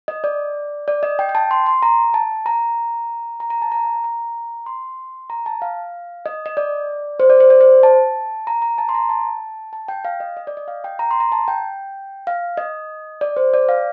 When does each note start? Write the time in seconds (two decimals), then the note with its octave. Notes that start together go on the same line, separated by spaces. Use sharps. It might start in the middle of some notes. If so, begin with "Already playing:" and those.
0.08 D#5
0.24 D5
0.88 D5
1.03 D#5
1.19 G5
1.29 G5
1.35 A5
1.51 C6
1.66 C6
1.83 A#5
2.14 A5
2.46 A#5
3.40 A#5
3.50 A#5
3.62 A5
3.72 A#5
4.04 A#5
4.66 C6
5.30 A#5
5.46 A5
5.62 F5
6.26 D#5
6.46 D#5
6.57 D5
7.20 C5
7.30 D5
7.40 C5
7.50 D5
7.61 C5
7.83 A5
8.47 A#5
8.62 A#5
8.78 A5
8.89 C6
8.94 A#5
9.10 A5
9.73 A5
9.88 G5
10.05 F5
10.20 D#5
10.37 D#5
10.47 D5
10.57 D#5
10.68 F5
10.84 G5
10.99 A#5
11.11 C6
11.20 A#5
11.32 A5
11.48 G5
12.27 F5
12.57 D#5
13.21 D5
13.37 C5
13.54 D5
13.69 F5